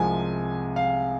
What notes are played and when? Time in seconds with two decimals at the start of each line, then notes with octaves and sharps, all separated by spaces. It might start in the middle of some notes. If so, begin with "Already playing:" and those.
Already playing: C2 C3 F3 G#3 G#5
0.76 F5